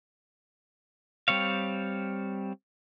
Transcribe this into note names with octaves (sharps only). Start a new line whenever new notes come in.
G3 C4 C#5 F5